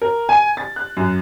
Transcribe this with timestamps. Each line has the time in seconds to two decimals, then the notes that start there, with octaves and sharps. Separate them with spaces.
0.02 A#4
0.29 G#5
0.57 A6
0.76 F#6
0.97 F#2